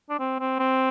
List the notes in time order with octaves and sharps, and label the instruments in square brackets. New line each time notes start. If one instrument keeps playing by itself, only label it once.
[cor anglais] D4
C4
C4
C4